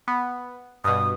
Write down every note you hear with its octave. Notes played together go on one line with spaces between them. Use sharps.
B3
G2 B2 D#6